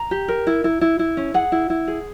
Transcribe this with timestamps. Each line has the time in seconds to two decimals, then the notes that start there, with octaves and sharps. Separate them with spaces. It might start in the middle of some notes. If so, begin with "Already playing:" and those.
Already playing: A#5
0.11 G4
0.28 A#4
0.47 E4
0.64 E4
0.81 E4
0.99 E4
1.17 C#4
1.34 G#4 F#5
1.52 E4
1.70 E4
1.88 G#4